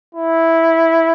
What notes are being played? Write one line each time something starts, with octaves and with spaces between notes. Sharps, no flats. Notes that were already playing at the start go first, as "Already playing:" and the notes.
E4